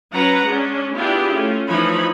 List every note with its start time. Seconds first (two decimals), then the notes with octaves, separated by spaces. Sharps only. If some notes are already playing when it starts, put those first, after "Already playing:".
0.13 F#3 C#4 B4 F#5 A#5
0.45 G#3 C#4 D4
0.95 B3 D4 E4 F4 G4 G#4
1.33 A3 C#4 F4
1.68 E3 F3 D#4 C#5 B5